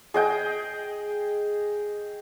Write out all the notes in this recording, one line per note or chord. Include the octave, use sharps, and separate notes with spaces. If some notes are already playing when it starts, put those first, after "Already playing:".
G#4 D#5 G5